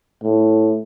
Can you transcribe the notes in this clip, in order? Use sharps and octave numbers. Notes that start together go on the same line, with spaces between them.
A2